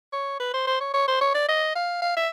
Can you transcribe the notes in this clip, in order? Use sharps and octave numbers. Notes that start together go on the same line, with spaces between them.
C#5
B4
C5
C5
C#5
C#5
C5
C#5
D5
D#5
F5
F5
E5